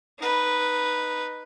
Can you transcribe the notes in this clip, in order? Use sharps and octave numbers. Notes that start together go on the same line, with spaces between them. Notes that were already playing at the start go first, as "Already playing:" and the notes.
D#4 B4